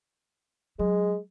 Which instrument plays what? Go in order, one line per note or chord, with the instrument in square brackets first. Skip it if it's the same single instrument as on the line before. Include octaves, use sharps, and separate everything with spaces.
[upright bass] F#3 [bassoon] G#3